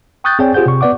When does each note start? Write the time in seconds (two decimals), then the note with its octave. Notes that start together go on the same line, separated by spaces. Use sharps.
0.24 G5 C#6 D#6 F#6 G6 A6
0.39 C4 G#4 C#5 D5 G5 G#5
0.54 F4 G4 G#4 C5 F#5 G6
0.66 C3 C#6
0.81 B3 B4 D5 F#5 D6